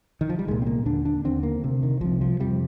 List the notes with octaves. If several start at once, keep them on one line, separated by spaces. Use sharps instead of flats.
D#3
F3
G3
C2 A#2 G#3
C4
A#3
D#2 D3 D4
D4
D#2 D3 C4
A#3
D2 C3
D#3
C2 C3 F3
F3
F2 C3 G3